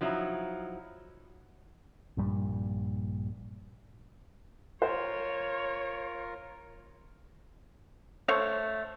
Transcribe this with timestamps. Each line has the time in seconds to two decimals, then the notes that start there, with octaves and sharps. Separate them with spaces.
0.01 F3 F#3 D#4 E4
2.17 A#1 G2 A#2 G3
4.82 F4 A#4 C5 C#5
8.28 A3 C5 C#5 F5